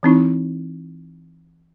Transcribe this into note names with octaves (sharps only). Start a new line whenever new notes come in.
E3 C4 D#4 E4